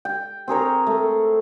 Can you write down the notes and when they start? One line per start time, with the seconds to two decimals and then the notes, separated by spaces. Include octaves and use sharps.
0.05 G5
0.48 C4 G#4 A#4 C#5
0.87 A3